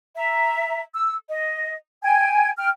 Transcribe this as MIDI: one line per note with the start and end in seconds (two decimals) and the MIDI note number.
0.16 0.81 76
0.16 0.81 82
0.93 1.15 88
1.29 1.74 75
2.03 2.50 79
2.03 2.50 80
2.03 2.50 92
2.57 2.69 79
2.57 2.69 89